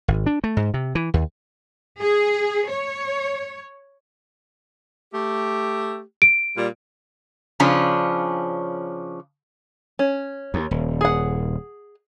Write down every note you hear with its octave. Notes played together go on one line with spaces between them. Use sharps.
G#1
D4
A3
G#2
C3
E3
D#2
G#4
C#5
A3 G4
D7
A#2 G3
C#3 F3 C#4 D4
C#4
D#2
D#1
G#4 F#5